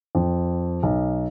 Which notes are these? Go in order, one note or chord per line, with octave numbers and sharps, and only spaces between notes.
F2
B1